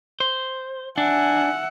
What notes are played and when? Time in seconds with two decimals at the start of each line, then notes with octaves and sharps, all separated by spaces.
0.20 C5
0.98 D4 E5 F#5 G#5